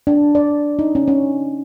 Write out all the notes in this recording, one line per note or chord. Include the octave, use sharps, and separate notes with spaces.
D4
D5
D#4
C#4
C#4